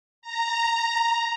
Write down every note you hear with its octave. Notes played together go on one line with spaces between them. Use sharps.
A#5